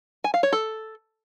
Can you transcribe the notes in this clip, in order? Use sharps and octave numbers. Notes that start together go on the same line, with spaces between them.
G#5
F5
C#5
A4